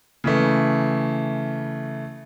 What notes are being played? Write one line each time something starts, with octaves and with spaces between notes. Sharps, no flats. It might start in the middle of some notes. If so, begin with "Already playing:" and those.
C#3 E3 A3